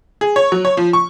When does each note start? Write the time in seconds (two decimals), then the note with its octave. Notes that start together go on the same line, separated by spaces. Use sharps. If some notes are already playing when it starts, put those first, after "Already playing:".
0.21 G#4
0.36 C#5
0.52 F#3
0.65 C#5
0.77 F3
0.93 C#6